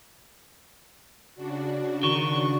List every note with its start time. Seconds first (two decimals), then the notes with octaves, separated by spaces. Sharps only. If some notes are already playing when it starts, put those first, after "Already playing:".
1.35 C#3 D4 F#4
2.03 D#3 C#6